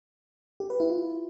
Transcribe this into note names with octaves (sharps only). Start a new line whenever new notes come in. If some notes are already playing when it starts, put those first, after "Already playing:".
G4
B4
E4
F4